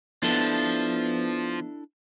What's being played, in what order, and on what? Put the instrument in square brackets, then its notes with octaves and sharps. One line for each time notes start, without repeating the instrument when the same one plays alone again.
[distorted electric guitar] F3 [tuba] B3 [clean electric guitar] D4 E4 A4